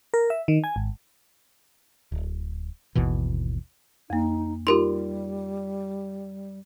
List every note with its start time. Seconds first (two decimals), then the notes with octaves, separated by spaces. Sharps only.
0.14 A#4
0.30 E5
0.48 D#3
0.64 G#5
0.76 G#1
2.12 D1
2.95 G#1 D#2 B2 E3
4.10 F2 A#3 D#4
4.67 G3 D#4 F4 G4 A#4 C6